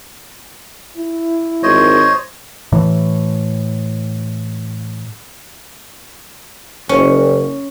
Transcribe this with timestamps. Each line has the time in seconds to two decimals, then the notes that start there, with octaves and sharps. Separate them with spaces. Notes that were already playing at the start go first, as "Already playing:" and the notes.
0.98 E4
1.63 G#1 C5 C#5 D#5
2.72 A2 E3
6.89 F#1 C#4